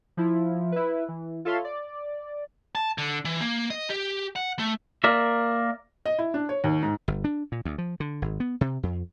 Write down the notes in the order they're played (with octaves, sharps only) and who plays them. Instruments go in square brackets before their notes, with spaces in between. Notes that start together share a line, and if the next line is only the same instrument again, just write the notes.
[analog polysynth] F3 E4
E4 B4
E3
F4 A4 C#5 E5 F5 C6
D5
[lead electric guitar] A5
D3
E3
A#3
D#5
G4
F#5
A3
[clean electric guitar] A#3 A#4 D5 E5
[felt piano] D#5
E4
D4
C#5
D#2
G#2
[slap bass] G1
D4
A#2
D2
F3
D3
G#1
B3
C3
F2